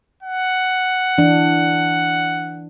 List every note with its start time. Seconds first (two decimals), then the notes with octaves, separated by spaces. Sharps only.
0.23 F#5
1.18 E3 D4